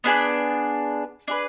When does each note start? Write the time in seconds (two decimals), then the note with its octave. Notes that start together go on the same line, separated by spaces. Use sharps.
0.04 B3 D4 G#4 D5
1.28 D4 G#4 B4